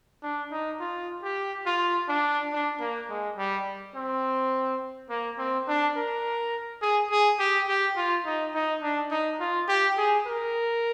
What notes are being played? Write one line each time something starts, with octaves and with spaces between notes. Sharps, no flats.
D4
D#4
F4
G4
F4
D4
D4
A#3
G#3
G3
C4
A#3
C4
D4
A#4
G#4
G#4
G4
G4
F4
D#4
D#4
D4
D#4
F4
G4
G#4
A#4